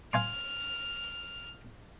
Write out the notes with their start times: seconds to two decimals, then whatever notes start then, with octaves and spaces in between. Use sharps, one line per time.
0.13 F5 G#5 C6 F6